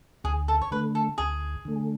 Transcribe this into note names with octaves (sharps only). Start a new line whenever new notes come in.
D2 G#4
A4
C#5
D3 A3 B4
A4
D2 G#4
D3 A3